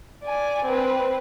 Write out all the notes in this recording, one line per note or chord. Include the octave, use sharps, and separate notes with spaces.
D5 G#5
C4 B4